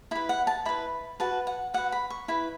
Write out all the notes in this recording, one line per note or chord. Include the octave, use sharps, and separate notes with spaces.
E4 B4 B5
F#5
A5
E4 B4 B5
F#4 B4 A5
F#5
F#4 B4 F#5
B5
C#6
E4 B4 B5